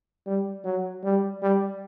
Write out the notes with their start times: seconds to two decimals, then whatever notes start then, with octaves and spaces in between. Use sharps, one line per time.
0.27 G3
0.65 F#3
1.04 G3
1.42 G3